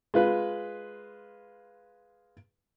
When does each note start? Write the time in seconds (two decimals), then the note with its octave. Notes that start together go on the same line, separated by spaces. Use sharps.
0.14 G#3 F4 B4